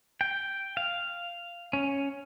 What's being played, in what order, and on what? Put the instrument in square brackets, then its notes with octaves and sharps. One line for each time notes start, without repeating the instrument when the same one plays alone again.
[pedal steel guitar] G5
F5
C#4